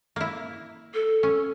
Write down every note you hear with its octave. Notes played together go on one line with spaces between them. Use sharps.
A#3 E4
A4
C#4